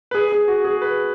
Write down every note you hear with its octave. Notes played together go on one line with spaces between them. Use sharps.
B4
G#4
G#4
F#4
G#4
B4